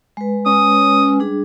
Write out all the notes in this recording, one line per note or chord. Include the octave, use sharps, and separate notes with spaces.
G#3 B4
C#4 D#6
G3 D4 G#4